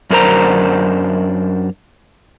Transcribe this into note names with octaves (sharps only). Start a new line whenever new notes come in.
F#2 D4 A#4 C5 A#5